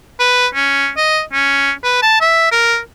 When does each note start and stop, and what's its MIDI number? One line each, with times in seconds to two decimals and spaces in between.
0.20 0.47 71
0.54 0.89 61
0.97 1.21 75
1.33 1.72 61
1.84 1.98 71
2.02 2.21 81
2.21 2.48 76
2.52 2.78 70